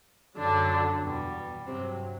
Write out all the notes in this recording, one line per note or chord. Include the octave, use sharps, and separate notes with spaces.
F#2 D3 F#3 D4
E2 B2 G3
G2 C3 F#3 C4